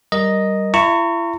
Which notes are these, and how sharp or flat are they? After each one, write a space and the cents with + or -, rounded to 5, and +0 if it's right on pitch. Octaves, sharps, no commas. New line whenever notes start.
G3 -15 A#4 +0 D#5 +0
E4 +40 A#5 -35 C#6 +0